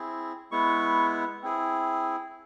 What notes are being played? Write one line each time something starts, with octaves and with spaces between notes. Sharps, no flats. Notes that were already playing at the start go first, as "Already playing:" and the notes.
Already playing: C4 E4 G#4
G#3 B3 E4 C#6
C4 E4 G#4